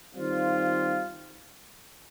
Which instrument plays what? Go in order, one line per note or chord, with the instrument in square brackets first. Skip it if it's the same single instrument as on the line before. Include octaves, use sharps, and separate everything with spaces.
[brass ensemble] D#3 G3 C4 F4